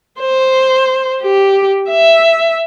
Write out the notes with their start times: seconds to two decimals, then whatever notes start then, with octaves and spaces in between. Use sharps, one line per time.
0.20 C5
1.22 G4
1.89 E5